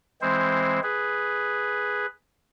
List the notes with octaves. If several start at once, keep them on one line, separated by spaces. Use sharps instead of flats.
E3 G#3 C4 C5
G#4 B4